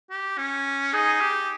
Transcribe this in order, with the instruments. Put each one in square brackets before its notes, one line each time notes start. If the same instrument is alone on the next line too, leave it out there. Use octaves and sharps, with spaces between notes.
[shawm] G4
C#4
[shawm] D#4 [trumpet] G#4
[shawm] G4